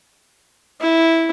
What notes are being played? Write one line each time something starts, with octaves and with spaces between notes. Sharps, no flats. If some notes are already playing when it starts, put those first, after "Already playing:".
E4